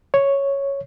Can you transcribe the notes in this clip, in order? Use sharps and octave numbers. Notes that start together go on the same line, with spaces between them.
C#5